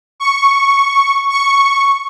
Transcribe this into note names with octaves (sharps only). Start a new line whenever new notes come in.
C#6
C#6